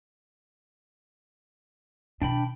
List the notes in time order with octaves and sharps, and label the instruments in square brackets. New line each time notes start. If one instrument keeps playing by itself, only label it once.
[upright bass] B2 D#3 [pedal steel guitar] D4 G5 B5